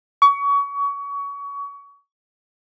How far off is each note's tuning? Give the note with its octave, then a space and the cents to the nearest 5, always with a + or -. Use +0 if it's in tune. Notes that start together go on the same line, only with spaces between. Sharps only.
C#6 +30